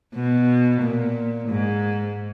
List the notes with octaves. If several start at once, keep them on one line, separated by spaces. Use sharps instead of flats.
B2
A#2
G#2